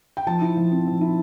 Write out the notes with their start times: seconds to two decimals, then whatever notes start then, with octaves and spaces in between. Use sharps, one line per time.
0.17 G5
0.27 F3 A5
0.41 E4
0.57 F3
0.72 C4
0.87 F3
1.01 E4